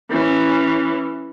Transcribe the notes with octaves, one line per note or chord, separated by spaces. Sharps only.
E3 C#4